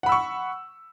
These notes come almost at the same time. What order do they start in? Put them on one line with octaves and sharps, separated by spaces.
F#5 B5 E6 C#6